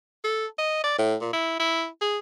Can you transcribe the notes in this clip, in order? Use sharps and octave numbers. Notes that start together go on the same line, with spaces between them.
A4
D#5
D5
A2
A#2
E4
E4
G#4